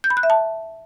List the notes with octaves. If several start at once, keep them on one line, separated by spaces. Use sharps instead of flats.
G6
B5
F#6
E5
A5